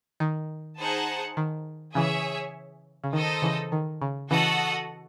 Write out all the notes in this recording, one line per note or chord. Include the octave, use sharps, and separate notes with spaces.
D#3
D#4 G#4 C5 F#5 A5
D#3
C#3 E3 G#4 C#5 E5
C#3
D#3 D#4 A4 C5 D#5
C#3 E3
D#3
C#3
C#3 E3 F#4 A4 D#5 F#5